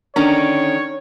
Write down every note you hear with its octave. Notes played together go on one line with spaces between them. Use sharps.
D3 D#3 C#4 D4 C#5